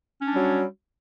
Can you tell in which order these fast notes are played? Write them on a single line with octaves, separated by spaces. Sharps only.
C#4 D4 G3 F#3